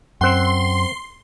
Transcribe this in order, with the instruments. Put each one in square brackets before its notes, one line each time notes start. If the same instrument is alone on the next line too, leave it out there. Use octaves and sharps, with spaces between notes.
[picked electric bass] F#2 [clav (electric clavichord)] C4 F#5 [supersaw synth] C6